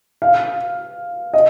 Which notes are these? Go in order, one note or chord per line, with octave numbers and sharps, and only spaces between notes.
F5
D#5